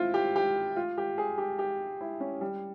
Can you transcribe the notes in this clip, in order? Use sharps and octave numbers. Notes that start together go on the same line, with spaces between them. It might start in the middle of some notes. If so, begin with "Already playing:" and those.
Already playing: C4 E4 F4
G4
G4
F4
G4
G#4
G4
G4
E4
C#4
G3